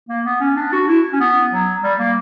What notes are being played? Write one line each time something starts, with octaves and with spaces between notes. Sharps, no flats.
A#3
B3
C#4
D4
F#4
E4
C#4
B3
F#3
G3
A#3